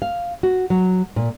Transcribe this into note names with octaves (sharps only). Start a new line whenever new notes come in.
F5
F#4
F#3
A#2